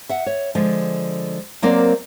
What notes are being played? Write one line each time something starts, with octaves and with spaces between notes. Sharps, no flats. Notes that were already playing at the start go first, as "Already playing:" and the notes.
E5 F#5
C#5
D3 F3 G#3
F#3 A#3 C4 A#4 C5 D5